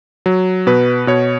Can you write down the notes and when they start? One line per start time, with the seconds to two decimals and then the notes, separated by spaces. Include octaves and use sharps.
0.26 F#3
0.67 B2 B4
1.07 B2 C#5